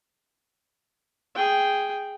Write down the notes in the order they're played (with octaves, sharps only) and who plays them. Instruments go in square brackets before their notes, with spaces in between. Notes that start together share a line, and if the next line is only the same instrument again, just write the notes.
[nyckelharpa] G#4 G5